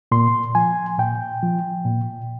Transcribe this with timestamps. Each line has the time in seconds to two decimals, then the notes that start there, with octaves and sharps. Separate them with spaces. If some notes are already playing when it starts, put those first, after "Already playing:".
0.12 A#2 C6
0.55 F3 G#5
0.99 A#2 G5
1.43 F3
1.85 A#2